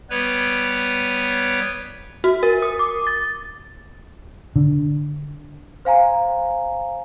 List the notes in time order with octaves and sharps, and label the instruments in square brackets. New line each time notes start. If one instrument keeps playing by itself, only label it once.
[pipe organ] G3 B3 B4 C#5
[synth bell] F#4
A#4
D#6
D6
A6
[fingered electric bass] D3
[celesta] C5 F5 G#5 A#5